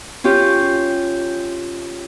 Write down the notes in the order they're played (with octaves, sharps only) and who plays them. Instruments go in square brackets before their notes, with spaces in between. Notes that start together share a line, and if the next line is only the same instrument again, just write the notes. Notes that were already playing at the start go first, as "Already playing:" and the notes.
[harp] C#4 F4 G4